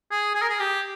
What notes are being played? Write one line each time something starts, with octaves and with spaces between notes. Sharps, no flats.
G#4
G#4
A#4
G#4
G4